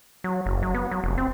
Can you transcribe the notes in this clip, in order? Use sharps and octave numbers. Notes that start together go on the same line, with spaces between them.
F#3
F#1
F#3
B3
F#3
F1
C4